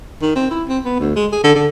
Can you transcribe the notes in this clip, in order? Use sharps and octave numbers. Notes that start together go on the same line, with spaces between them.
D#3
C4
E4
C4
B3
D2
G#3
G#4
D3
D3